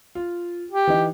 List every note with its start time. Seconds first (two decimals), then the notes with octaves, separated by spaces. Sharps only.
0.15 F4
0.71 G4
0.87 E3 D#4